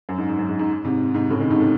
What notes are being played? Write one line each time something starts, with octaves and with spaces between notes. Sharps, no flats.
F#2
G#2
G#2
F#2
G#2
G#2
G#2 C3
G#2 C3
A2 C#3
C3 D#3
G#2 C3
A2